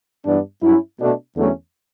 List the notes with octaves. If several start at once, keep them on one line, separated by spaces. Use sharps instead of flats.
G2 E3 B3 D4
G2 F#3 C#4 E4
B2 A3 D4
E2 D3 F#3 A3 C#4